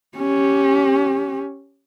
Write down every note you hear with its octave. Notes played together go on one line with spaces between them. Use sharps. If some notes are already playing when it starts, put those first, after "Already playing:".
C#4 G4